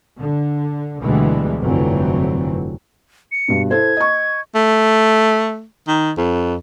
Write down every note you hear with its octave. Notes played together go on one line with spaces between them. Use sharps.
D3
D2 B2 D3 E3 G3 G#3
F1 G2 D3 E3 F#3 C4
C#7
G2 B2
E4 A4 C5 G#6
D#5 C#6
A3
D#3
F2